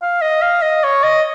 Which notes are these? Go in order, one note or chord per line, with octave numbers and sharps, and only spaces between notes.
F5
D#5
F5
D#5
C#5
D#5